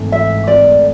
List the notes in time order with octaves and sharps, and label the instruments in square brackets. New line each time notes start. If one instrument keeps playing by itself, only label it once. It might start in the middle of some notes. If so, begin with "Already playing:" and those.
Already playing: [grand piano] G#1 G#2 E3 A3
[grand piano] E3 [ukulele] E5
[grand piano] G#2
[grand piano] G#1 [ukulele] D5
[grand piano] A3